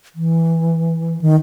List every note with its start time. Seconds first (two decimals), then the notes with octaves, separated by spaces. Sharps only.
0.15 E3
1.21 D#3